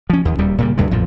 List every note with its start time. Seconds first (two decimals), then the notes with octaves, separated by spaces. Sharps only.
0.10 F3 C#4
0.25 D#2
0.38 D#1 D#2 G3
0.58 A#2 C#3 G3
0.78 D2 G2 C3 G#3
0.91 A1 F2 A#2 F3